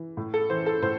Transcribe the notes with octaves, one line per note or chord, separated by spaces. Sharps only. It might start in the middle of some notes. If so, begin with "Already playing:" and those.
Already playing: E3
A2
A4
E3 C5
A4
A2 C5